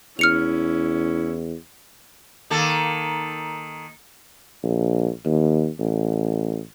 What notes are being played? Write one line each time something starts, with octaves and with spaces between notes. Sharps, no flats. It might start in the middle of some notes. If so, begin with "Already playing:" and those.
E2 C#4 E4 F6 C#7 F7
D#3 A#3 A4
A#1
D#2
A1